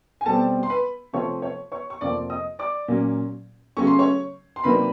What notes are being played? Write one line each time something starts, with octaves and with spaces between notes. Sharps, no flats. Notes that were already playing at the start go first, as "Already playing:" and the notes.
G#5
B2 G3 C4 A4 A5
C6
B4 B5
C3 F3 A3 C#5 C#6
C#5 C#6
C#5 C#6
C#6
F2 C3 F3 A#3 D5 D6
D#5 D#6
D5 D6
A#2 F#3 A#3 C#4
C#3 F#3 A3 C#4 C#6
C6
C#5 C#6
C6
C3 D#3 F#3 A#3 D4 B4 B5